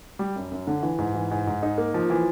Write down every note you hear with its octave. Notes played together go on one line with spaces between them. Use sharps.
G3
F#2
F#2
D3
E3
G#2
E3
G#2
G#2
D#4
A#3
F3
E3